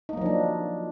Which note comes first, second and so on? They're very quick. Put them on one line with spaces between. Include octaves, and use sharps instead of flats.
D#4 A#3 F#3 F3 D4